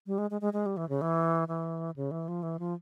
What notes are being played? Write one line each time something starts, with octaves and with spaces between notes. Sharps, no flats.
G3
G#3
G#3
G#3
G#3
G3
E3
C#3
E3
E3
C#3
E3
F3
E3
F3